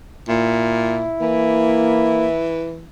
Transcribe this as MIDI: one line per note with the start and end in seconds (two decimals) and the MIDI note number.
0.29 1.09 46
0.29 2.53 64
1.21 2.88 52
1.21 2.27 58